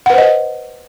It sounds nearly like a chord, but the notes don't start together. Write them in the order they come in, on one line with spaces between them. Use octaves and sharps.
F#5 B4 C5 D#5